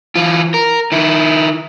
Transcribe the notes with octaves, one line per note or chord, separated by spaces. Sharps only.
E3 F4
A#4
D#3 E4